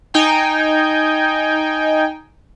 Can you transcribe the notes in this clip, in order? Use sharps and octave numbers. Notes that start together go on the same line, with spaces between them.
D#4 G5 G#5